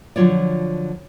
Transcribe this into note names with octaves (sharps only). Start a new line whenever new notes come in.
D3 F3 F#3 F4 C#5 D5